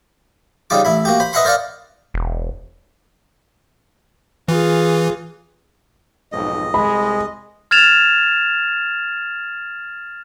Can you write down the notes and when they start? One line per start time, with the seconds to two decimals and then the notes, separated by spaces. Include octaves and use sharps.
0.70 C#3 G3 D#4 F4 D6
0.85 A1 E4 B5
1.05 A#3 F#4 G4
1.20 C5 B5
1.33 B4 D#5 E5 F#5 B5 C6
1.45 A#4 C5 D5 F5 F#5
2.14 E1
4.48 E3 F4 G#4
6.32 B1 F2 G#2 D#5
6.74 C2 G#3 B5
7.71 F6 G#6 A6 E7 F7